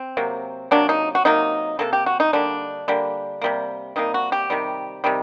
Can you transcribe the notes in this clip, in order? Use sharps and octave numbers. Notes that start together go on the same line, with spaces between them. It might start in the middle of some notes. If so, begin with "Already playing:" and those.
Already playing: C4
C3 F#3 A#3
C3 F#3 A#3 D4
D#4
F#4
C3 F#3 A#3 D#4
C3 F#3 A#3 A4
G4
F#4
D#4
D3 G3 A#3 D4
D3 G3 A#3
C3 G3 A#3
C3 G3 A#3 D#4
F#4
G4
C3 D#3 G3
C3 D#3 G3